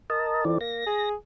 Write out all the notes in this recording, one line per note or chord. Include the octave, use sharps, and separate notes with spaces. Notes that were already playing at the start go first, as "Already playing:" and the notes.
A#4 D#5 A5
F2 E3 D5
A#3 A#6
G#4